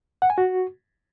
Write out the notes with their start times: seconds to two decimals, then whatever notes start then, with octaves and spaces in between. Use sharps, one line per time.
0.22 F#5
0.30 G#5
0.38 F#4